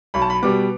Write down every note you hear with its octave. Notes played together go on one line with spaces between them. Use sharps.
B1 B5
A5
B5
B2 G3 B3 D6